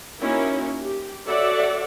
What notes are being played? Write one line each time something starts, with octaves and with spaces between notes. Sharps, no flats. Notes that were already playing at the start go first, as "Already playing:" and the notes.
A#3 C#4 D#4 E4 F#4
G4
F#4 A4 C#5 D5 E5 F#5